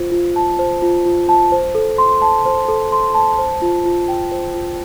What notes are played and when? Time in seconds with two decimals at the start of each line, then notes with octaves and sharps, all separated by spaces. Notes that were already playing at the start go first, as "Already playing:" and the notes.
Already playing: F4 C5
0.12 F4
0.36 A5
0.59 C5
0.82 F4
1.05 F4
1.29 A5
1.52 C5
1.75 A4
1.98 C6
2.22 A5
2.46 C5
2.68 A4
2.92 C6
3.14 A5
3.39 C5
3.62 F4
3.85 F4
4.08 G5
4.31 C5
4.54 F4